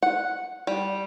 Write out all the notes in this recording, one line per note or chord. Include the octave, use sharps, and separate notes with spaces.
F#5
G3